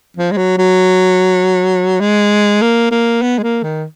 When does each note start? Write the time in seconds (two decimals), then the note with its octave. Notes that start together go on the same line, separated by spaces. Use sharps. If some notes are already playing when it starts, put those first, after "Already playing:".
0.17 F3
0.32 G#3
0.37 F#3
0.58 F#3
2.01 G#3
2.62 A#3
2.91 A#3
3.22 B3
3.38 G#3
3.43 A#3
3.63 D#3